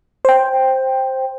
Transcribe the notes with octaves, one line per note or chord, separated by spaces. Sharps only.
C5 G5